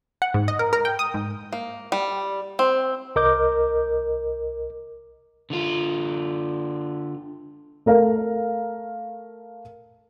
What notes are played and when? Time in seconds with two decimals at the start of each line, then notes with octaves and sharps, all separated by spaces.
0.22 F#5
0.34 G#2
0.48 D#5
0.59 A#4
0.73 A#4
0.85 G5
0.99 D#6
1.14 G#2
1.53 A#3
1.92 G3
2.59 C4
3.16 C2 A#4 D#5 D6 G6
5.50 D3 F4
7.86 A3 A#4 F5